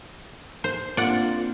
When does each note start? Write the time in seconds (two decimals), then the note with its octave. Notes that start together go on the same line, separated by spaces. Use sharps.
0.64 C5
0.97 A#3 C4 D4 F4 D5 F#5